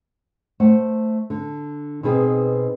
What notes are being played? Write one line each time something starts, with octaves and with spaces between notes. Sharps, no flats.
A3 C5 F#5
D3
B2 C4 D#4 G#4 B4